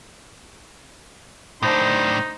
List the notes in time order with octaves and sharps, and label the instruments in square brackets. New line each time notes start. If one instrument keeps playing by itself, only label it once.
[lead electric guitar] A2 D4 [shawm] D#4 [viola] C5